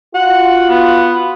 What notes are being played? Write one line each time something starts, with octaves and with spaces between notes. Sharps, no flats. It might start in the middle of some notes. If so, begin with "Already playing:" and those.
F4 F#4 F#5
B3